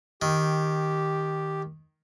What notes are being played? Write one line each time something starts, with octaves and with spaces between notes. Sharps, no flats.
D#3 G4